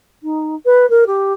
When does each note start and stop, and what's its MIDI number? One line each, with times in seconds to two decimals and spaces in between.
0.23 0.55 63
0.65 0.88 71
0.90 1.04 70
1.06 1.33 67